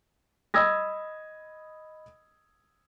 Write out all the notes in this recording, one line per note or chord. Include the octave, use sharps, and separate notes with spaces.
D#5 B5 D#6 E6 G#6 A#6